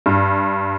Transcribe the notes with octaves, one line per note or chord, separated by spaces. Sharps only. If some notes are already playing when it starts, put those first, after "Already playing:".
G2